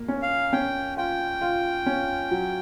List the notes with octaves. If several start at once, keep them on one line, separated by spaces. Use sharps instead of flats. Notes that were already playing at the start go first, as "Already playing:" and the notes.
Already playing: A#3
C#4
F5
C#4 G5
F4 G5
F4
C#4
F#3